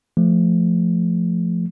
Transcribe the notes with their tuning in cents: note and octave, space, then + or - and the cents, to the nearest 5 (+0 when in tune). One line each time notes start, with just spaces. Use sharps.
F3 -5 A3 +0